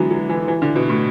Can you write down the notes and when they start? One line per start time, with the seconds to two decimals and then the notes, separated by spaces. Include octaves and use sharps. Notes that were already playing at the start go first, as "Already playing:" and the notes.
Already playing: D3 E3 F#3 G#3 B3
0.11 F#3
0.29 E3
0.48 E3
0.62 D3
0.75 B2
0.89 A2